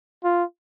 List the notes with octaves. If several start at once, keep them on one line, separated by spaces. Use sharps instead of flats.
F4